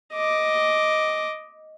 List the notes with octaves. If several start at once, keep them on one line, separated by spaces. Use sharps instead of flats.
D#5 D6